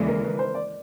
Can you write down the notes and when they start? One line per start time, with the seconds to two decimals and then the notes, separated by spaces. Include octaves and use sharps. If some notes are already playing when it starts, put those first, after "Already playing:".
Already playing: D#2 C#3 E3 G#3 A4 D5
0.08 A#4
0.23 B4
0.39 C5
0.54 D5